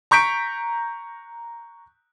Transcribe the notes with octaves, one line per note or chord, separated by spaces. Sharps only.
A#5 C#6 G6 B6 D7